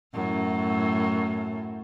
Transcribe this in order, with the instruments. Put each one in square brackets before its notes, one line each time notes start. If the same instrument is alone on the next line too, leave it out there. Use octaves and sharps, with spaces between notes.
[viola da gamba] F#2 A2